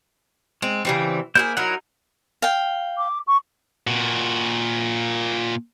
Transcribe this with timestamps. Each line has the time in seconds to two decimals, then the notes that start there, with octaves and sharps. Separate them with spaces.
0.62 G#3 C4
0.85 C#3 E3 G3 C4
1.35 A#3 E4 G4 G#4 C5 G6
1.57 F#3 D#4 E4 A#4 F#5
2.42 F5 G5
2.98 D6
3.27 C#6
3.87 A#2 F#4